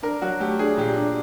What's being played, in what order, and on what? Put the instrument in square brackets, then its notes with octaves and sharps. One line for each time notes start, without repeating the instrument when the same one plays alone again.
[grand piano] D4 [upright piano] A#4
[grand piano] F#3 [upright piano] F#4
[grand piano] A3 [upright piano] G4
[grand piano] D4 [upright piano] G#4
[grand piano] A#2 [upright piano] G4
[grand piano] D4